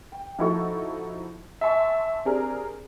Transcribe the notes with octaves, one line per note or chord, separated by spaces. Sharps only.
G5
F3 D#4 E4 F#4 A4 C#6
E5 G#5 A5 C6 C#6
C4 D4 G4 G#4 A#4